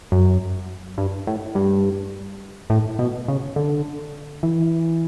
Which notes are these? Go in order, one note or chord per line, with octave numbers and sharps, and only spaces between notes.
F#2
G2
A2
G2
A2
B2
C#3
D3
E3